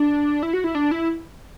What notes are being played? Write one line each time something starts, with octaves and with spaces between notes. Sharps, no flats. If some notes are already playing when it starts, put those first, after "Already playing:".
Already playing: D4
E4
F#4
E4
D4
E4